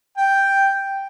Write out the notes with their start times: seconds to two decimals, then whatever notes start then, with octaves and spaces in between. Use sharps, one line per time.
0.17 G5